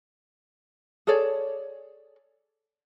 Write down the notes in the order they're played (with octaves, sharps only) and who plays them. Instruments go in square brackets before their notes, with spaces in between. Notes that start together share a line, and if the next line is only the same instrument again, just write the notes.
[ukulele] G#4 A4 C#5 D5